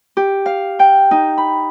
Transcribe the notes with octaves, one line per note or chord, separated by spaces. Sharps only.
G4
F5
G5
D#4
B5